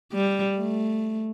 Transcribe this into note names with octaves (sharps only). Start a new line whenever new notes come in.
G3
A3